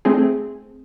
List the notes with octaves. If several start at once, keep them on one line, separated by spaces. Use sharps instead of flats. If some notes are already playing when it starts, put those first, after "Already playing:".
A3 C4 G#4